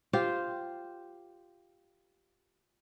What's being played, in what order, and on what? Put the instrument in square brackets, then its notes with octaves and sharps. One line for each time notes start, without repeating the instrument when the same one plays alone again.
[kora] F4 G4 C5